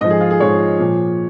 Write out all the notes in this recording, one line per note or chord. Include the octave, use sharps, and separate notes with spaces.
G#2 F3 D#5
G#4
F4
G#4
G#2 F3 C#5
A#2 F3